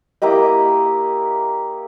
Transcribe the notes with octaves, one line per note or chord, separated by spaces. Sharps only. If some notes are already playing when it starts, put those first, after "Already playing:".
A#3 E4 G4 D#5